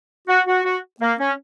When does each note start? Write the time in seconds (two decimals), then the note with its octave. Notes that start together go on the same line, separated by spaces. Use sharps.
0.28 F#4
0.47 F#4
0.64 F#4
1.01 A#3
1.19 C#4